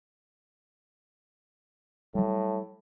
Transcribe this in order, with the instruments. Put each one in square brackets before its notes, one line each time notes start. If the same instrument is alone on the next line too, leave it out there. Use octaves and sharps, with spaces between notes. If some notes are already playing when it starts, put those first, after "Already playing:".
[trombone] A2 [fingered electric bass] F#3 G3